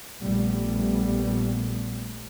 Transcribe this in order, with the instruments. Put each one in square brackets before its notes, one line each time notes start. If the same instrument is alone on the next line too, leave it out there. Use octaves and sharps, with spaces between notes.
[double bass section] A#1 G3 A3 B3